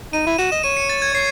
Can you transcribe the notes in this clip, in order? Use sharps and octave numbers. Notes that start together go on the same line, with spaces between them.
D#4 D#7
E4
F#4 E7
D#5 E7
C#5 D#7
C#7
A6
G#6
C#5 C7